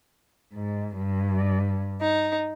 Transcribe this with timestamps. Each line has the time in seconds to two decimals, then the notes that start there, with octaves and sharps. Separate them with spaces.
0.54 G#2
0.98 G2
2.00 D#4